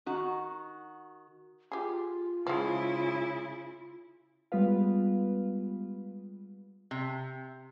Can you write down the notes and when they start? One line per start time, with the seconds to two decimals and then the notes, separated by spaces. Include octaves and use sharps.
0.06 D#3 F#4
1.72 F4 G4 G#4
2.47 C#3 F3 G#3 E4
4.52 G3 G#3 B3 F4 B4 F5
6.91 C3